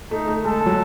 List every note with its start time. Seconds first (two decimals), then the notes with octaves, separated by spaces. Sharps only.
0.11 A3 D#4
0.28 A3
0.44 G#3 A4
0.66 F#3